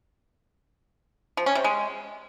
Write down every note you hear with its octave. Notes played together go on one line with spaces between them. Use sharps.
F3
C#4
C3
G#3